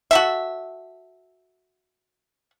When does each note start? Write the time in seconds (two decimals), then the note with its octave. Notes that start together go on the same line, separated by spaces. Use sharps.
0.11 F#4 A4 E5